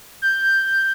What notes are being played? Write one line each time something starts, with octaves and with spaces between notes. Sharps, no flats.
G6